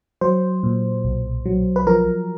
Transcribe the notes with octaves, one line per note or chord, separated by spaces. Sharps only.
F#3 C5
A#2
B1
F#3
B4
F3 A#4